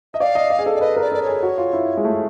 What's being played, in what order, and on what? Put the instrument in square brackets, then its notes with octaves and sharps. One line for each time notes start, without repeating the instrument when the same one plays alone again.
[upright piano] D#5 [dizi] E5
[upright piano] D5 [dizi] F5
[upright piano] D#5
D5
G#4
A4
[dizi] D5
[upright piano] B4 [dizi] D#5
[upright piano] A#4
[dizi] D5
[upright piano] A4 [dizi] D5
[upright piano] G#4 [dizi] C#5
[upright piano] F#4
F4
E4
G#3
A3